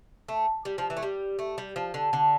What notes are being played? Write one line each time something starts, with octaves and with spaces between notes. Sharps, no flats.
A3
G3
F3
E3
A3
G3
A3
G3
F3
D3
D3